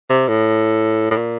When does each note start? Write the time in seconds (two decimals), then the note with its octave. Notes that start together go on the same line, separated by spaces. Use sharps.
0.09 C3
0.28 A2
1.11 A2
1.16 A#2